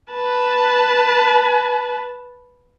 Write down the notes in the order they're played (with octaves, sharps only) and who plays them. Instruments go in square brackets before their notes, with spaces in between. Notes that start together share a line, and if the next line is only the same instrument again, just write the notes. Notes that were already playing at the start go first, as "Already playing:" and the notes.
[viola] B4 A5